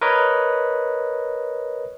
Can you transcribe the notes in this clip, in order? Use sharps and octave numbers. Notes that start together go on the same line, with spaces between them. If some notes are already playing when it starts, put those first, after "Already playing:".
A#4 B4 C#5 D#5